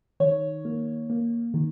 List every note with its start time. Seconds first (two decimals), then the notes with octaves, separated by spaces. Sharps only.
0.20 D#3 C#5
0.65 A#3
1.10 A#3
1.54 D#3